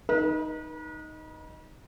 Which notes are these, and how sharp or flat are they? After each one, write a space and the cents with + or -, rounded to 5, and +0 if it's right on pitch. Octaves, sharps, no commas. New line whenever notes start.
D#4 +0 B4 -40